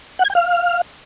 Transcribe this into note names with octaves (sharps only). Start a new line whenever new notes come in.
F#5
G#6
G5
F5